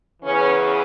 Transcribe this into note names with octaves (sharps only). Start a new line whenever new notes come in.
E2 C#3 E3 C#4